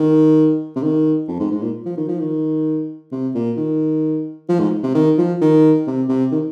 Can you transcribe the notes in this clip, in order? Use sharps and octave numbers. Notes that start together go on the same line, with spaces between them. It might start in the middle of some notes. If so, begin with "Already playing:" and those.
Already playing: D#3
C3
D#3
F2
G#2
G#2
A#2
F3
D#3
F3
D#3
C3
A#2
D#3
F3
G#2
C3
D#3
F3
D#3
C3
C3
D#3